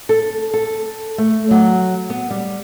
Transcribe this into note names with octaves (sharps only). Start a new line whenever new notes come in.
A4
A4
A3
F#3
B3
G3